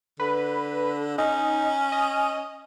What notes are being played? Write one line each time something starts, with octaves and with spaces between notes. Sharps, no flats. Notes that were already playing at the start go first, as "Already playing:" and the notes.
D3 B4
C#4 D#4
D#5